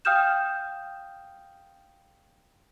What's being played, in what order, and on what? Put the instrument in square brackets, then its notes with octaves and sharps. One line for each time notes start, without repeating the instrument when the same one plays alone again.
[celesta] F5 G5 D#6 F6 G6 E7